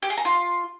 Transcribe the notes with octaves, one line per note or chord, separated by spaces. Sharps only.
G4
G#4
A#5
F4